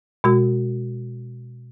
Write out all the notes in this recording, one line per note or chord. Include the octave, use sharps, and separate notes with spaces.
B2 G#3 F#4